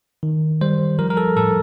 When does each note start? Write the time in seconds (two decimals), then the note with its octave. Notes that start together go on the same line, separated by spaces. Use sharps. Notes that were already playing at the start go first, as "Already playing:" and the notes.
0.23 D#3
0.61 G3 C5
0.99 F3 A#4
1.10 A#4
1.17 A4
1.37 A2 A4